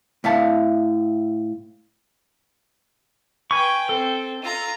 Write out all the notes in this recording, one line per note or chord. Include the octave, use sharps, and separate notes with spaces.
A2 E5 F5 A5
B4 G5 G#5 C#6
C4 A4
F4 A#5